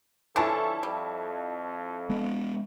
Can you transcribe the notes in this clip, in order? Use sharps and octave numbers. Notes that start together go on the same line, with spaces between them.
D3 E3 F3 C#4 E4 A4 A5 C#6
F2 G3
G#3 B3